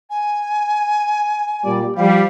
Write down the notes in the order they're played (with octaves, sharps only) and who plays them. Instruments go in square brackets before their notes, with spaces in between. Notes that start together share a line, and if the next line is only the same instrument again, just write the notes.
[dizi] G#5
[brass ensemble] A#2 G3 D5
[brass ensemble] F3 G3 [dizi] F5